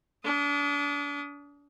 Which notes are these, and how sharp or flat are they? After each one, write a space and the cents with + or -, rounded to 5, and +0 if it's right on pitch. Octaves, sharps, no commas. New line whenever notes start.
D4 -35 D#6 +0